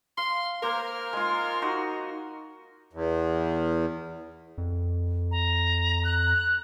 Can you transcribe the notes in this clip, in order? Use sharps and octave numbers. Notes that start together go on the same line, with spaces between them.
F5 C6
A#3 A#4 C5
G#3 F4
D#4 F#4
E2
F2
A#5
F#6